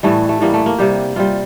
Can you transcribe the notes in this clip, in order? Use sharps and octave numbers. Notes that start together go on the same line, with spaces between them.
A2 E3 G3 A3
A3
A2 E3 G3 A#3
A3
A#3
C3 G3 G4
C3 G3 F4